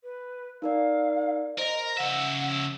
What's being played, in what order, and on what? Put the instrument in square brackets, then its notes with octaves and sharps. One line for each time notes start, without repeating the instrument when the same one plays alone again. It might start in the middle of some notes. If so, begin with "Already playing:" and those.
[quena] B4
[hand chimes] D#4 A#4 D5 [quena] F5
[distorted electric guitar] A#4 [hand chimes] C5 A#6 [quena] D#5
[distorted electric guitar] C#3 E5 [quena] F#5 [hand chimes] A#6